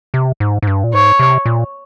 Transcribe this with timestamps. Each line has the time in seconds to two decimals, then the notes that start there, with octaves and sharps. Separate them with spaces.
0.14 C3
0.40 G#2
0.62 G#2
0.67 G2
0.84 A#2
0.93 G#2 C#5
1.19 C3
1.46 A#2